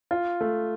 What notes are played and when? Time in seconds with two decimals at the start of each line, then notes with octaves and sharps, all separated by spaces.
0.11 F4
0.41 A3